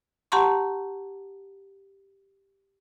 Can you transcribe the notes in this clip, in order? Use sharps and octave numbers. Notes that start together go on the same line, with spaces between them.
G4 F#5 A5 A#5 C6 C#6